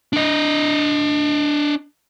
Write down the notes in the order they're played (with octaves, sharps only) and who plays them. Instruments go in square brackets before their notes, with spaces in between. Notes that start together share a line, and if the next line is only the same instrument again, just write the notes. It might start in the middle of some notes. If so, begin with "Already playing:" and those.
[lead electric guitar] D4 D#5